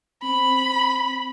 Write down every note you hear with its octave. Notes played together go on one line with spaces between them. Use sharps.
C4 B5